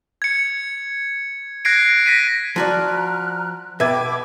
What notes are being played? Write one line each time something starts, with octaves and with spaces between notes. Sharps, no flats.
G#6 C#7
F#6 G#6 A#6 C7 D7
A#6 B6 D#7
F3 F#4 D5 A#5 F6 F#6
B2 B4 E5 G5 D6 G#6